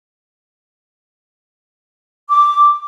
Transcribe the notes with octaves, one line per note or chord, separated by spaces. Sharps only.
D6